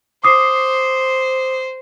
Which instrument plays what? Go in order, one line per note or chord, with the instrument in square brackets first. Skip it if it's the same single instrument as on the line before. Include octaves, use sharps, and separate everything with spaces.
[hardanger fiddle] C5 [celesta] D6 D#6 C7